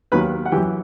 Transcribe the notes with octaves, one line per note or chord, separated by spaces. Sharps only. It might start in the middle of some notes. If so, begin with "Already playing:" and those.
D#2 D#3 F#3 B4 B5
F#5
F#2 E3 G4 G5